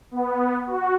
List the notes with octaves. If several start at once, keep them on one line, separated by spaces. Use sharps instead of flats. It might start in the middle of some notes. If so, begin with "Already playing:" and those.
B3
F#4